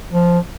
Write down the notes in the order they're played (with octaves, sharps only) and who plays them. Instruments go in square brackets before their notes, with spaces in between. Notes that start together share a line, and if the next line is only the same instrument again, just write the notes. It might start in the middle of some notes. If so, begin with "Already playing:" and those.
[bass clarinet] F3